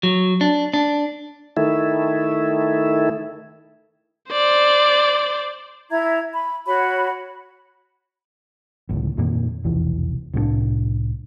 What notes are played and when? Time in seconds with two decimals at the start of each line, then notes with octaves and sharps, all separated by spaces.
0.03 F#3
0.41 D4
0.74 D4
1.57 D#3 A3 E4
4.30 C5 D5
5.91 E4 E5 A#5 G#6
6.33 B5
6.66 F#4 C#5 B5
8.89 G1 C#2 A2
9.18 F2 A#2 D#3 A#3
9.64 F1 B1 E2 E3
10.34 C2 A2 F3 D4